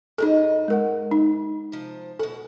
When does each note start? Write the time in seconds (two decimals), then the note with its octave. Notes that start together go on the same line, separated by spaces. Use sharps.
0.18 G#2 F#3 D#4 G#4 A4 D#5
0.68 G#3 A#4 F#5
1.11 D#4
1.72 C3 F3
2.19 B2 A4 F#5